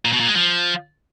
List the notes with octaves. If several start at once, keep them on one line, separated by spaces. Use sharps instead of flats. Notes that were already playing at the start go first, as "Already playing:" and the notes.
A#2
B2
A#2
G#3
F3